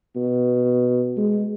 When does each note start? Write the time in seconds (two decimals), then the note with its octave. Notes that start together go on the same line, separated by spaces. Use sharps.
0.16 B2
1.17 G#3